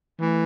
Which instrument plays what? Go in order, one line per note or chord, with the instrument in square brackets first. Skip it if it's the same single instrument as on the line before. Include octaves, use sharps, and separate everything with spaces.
[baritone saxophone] E3 [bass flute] A3